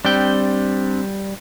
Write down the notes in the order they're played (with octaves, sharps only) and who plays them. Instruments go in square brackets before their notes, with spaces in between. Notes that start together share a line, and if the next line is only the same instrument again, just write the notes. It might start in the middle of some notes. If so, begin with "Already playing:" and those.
[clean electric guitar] G3 G5 [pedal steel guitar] C4 D4